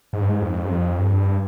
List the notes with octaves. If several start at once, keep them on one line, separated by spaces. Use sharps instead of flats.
G#2
G2
G#2
F2
G2
F2
G2